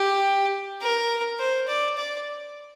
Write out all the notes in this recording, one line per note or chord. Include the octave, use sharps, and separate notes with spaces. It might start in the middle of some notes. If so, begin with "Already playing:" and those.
Already playing: G4
A#4
C5
D5
D5